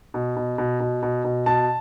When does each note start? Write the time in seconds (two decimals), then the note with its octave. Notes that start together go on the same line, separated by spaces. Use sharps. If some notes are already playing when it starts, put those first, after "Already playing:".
0.14 B2
0.36 B2
0.58 B2
0.80 B2
1.02 B2
1.24 B2
1.46 B2 A5